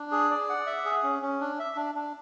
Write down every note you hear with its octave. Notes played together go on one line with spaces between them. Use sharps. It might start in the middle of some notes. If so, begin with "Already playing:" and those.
Already playing: D4
G#4
D5
F#5
E5
G#4
C#4
C#4
D4
E5
D4
D4